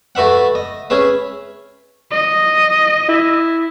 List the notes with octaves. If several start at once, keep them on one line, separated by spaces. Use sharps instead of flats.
A3 F#4 B4 E5 F#5
D#5
C#4 G#4 B4 E5
D#5
E4